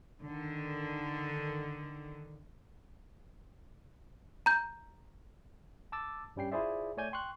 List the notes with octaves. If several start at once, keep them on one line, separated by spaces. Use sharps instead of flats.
D3 D#3
A#5 G6
A5 D6 E6 A6
G2 G3 C#4 G5 C7
E4 F4 G#4 C5 D5 E5
A3 C#5 D5 G#5 G6 G#6
G5 C6 C#6 F#6